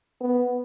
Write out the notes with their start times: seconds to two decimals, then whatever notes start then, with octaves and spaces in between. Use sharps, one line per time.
0.21 B3